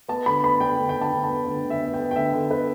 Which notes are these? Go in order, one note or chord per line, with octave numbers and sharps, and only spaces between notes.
B3 A5
D3 B5
B3 B5
D4 G5
D3
G5
D3
A5
D3
A5
B3
D3
D3
E5
B3
G5
B3
G5
D3 E5
D3
B3 B4